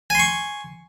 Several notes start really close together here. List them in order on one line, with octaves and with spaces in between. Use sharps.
G#5 C6 C#6